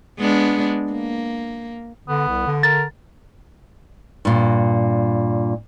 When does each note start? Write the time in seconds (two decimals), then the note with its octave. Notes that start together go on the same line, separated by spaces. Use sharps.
0.19 G#3 B3 D4
0.93 A#3
2.08 D3 B3
2.28 C2
2.47 D3
2.63 A#4 A6
4.25 G2 A#2